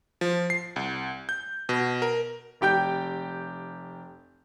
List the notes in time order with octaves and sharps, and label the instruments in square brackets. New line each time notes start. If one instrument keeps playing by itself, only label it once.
[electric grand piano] F3
C7
C2
G6
B2
A#4
[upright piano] F1 G4 G5 G6